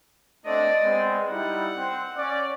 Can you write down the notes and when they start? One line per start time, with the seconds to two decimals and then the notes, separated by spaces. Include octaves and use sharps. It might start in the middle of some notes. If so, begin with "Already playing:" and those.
0.45 A3 C4 D4 D5 D#5
0.81 G#3 B3 C4
1.30 G3 D#4 E4 F#5
1.77 C4
2.16 C#4 D5